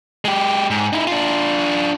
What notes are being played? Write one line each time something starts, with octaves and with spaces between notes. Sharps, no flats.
G#3 G4
G#2
D#4 E4
D4 F4